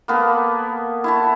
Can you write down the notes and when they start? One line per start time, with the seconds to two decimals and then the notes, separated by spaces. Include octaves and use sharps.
0.08 A#3 B3 A4
1.04 E4 C#5 A5